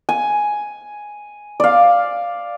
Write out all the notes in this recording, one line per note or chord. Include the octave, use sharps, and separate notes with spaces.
G#5
D5 F5